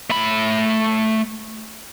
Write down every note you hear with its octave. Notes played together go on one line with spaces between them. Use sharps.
A3 B5